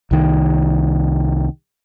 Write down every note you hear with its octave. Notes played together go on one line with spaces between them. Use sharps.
C2 D#3